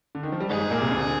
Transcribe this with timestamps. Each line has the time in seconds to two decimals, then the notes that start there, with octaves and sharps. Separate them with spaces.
0.15 D3
0.23 D#3
0.32 F3
0.41 G3
0.50 G#2 G#3 G#4
0.60 G#2 G#3
0.71 A#2 A#3
0.81 C2 C3
0.91 D2 D3